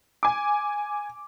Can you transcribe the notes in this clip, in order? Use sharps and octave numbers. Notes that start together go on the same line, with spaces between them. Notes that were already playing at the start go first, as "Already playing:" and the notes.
G#5 D6